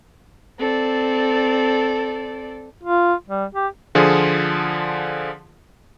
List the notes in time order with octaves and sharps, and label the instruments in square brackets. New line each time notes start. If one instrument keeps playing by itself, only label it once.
[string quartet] C4 A4 D5
[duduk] F4
G3
G4
[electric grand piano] D3 F3 F4 G#4